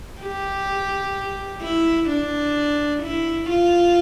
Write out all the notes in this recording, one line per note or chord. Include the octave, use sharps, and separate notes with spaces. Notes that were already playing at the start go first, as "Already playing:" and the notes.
G4
E4
D4
E4
F4